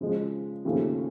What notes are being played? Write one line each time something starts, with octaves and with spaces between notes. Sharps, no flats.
C#3 F3 G#3
D#2 C#3 F3 A3